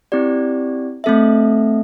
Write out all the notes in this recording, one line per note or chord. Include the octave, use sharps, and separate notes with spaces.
C4 E4 G4 D5
A3 C4 A4 E5